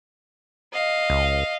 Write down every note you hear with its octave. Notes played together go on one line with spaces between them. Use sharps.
D#5 F5
C#2